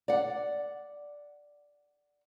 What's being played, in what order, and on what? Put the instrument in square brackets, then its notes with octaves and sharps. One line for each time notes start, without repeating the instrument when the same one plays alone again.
[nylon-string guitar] D5 F#5